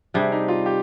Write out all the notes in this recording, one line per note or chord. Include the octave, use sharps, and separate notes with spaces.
C3 G3 D4 G4 G#4
D#4
F4
G4